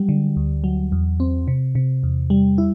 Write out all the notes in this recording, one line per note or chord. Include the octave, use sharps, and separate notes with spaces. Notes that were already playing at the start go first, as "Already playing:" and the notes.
Already playing: F#3 G3
D3
D2
F#3
E2
C4
C3
C3
E2
G3
E4